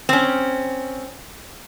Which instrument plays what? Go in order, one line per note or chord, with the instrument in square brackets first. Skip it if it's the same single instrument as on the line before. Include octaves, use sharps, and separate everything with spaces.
[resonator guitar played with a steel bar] C4 C#4